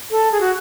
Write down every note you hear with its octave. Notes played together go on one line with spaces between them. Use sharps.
A4
G#4
F#4